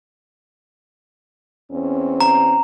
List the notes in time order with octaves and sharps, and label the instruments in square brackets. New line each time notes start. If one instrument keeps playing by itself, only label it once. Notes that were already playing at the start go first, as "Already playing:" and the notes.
[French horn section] E2 C4 C#4
[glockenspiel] A#5